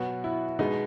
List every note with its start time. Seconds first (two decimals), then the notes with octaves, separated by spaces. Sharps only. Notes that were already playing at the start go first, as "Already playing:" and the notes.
Already playing: B2 F#3 B3 F#4
0.24 E4
0.59 B2 G#3 B3 D#4